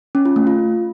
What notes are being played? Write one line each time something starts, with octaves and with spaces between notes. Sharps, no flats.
C#4
F4
A3
F4